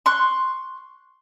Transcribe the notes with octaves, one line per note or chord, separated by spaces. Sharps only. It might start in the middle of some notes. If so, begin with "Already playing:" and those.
C6 C#6 F#6